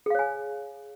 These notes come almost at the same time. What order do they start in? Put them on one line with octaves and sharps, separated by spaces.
G#4 F5 C#5 G#5